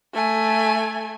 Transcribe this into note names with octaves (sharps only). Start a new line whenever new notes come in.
A3 G#5